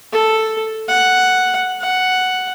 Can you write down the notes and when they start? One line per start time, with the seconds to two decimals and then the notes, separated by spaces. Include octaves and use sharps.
0.12 A4
0.88 F#5
1.79 F#5